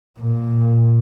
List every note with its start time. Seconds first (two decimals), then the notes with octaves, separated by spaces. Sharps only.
0.20 A#2